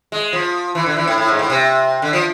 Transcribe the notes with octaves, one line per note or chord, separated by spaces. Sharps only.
G#3
F3
E3
D3
E3
A2
A2
G#2
A2
C3
D3
F3